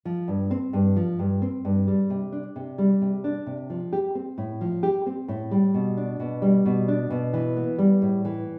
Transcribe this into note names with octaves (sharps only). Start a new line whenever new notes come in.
F3
G2
C4
G2
F3
G2
C4
G2
G3
C3
D4
C3
G3
C3
D4
C3
F3
G4
C4
A2
F3
G4
C4
A2
G3
B2
D4
B2
G3
B2
D4
B2
E3
B3
G3
A2
E3